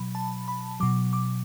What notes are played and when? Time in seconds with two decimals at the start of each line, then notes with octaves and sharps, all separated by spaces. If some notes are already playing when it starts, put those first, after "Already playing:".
Already playing: B2 F#3 B5
0.15 A5
0.48 B5
0.80 B2 F#3 D6
1.13 D6